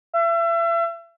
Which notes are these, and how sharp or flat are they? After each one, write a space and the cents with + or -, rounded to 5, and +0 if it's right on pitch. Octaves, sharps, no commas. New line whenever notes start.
E5 +35